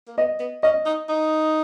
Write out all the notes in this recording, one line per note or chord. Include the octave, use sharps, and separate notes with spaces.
A#3
B3 D#5
B3
C#4 D#5
D#4
D#4